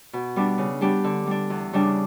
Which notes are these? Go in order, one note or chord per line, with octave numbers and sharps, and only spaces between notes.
B2
G3 B3 D4
C#3
G3 B3 D4 G4
D3
G3 D4
E2
C#3 G3 D4